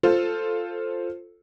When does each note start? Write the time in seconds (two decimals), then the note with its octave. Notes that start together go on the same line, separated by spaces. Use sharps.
0.03 F4 A4 C5